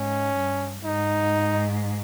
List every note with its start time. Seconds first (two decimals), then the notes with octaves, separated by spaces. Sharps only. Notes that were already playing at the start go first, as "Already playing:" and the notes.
Already playing: G#2 C#4
0.37 G2
0.84 G#2 D#4